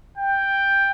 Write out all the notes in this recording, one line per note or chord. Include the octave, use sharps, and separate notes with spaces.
G5